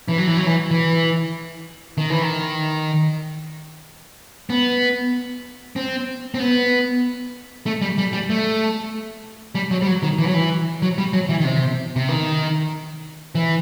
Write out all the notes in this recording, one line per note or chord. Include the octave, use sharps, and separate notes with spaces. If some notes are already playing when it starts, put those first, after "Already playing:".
E3
F#3
E3
F#3
E3
E3
D#3
E3
D#3
B3
C4
C4
B3
A3
G3
G3
G3
A3
G3
F#3
G3
F#3
D#3
E3
F#3
E3
F#3
G3
F#3
E3
D#3
C3
C3
D#3
E3